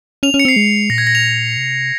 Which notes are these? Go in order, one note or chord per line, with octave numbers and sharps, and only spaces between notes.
C#4 F7
C#4
C#7
C4 C7
G#3
A#2 A#6
G#6
A#6
F7
C3